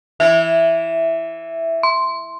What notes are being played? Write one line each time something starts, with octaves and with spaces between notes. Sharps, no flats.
E3 E5
C6